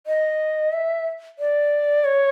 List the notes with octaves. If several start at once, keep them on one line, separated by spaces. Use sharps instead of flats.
D#5
E5
D5
C#5